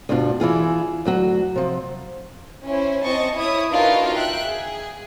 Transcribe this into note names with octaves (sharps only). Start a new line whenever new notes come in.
D2 G2 B2 D4 F4
E3 E4 F4 G#4
D2 F#3 F#4
C3 F3
C#4 E4 C5
C4 D#5 A5 C#6
E4 C#5 E5 D#6
D4 D#4 F4 F#4 A#4 B4
E5 G5 F#6
G#4